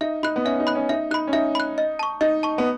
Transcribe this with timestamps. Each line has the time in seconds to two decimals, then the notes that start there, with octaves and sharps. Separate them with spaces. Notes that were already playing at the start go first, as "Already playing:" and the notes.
0.01 D#4 E5
0.23 D#4 B5 F#6
0.36 B3
0.45 C#4 E5
0.60 D#4
0.67 B5 F#6
0.75 C#4
0.89 D#4 E5
1.11 D#4 B5 F#6
1.27 C#4
1.33 D#4 E5
1.55 B5 F#6
1.78 D#5
1.99 A5 C#6
2.21 D#4 D#5
2.43 A5 C#6
2.58 B3